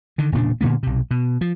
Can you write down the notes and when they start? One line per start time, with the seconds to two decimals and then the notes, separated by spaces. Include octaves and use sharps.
0.18 D3 D#3
0.32 E1 A#2 C#3 D4
0.61 A#2 D3 A#3 B3
0.83 B1 C3
1.11 B2
1.41 F3